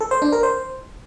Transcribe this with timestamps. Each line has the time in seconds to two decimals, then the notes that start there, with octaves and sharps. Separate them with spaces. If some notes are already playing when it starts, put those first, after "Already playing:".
0.01 A4
0.11 C5
0.22 D4
0.32 A#4
0.43 C5